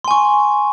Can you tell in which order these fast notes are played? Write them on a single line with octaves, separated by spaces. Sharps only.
C6 G#5 C#6